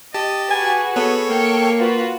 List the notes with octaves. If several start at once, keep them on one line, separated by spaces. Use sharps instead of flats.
G4 D#5 A5
F#4 G#4 B4 G#5
B3 A4 C#5
A#3 G5 C#7
F4 F#4 B4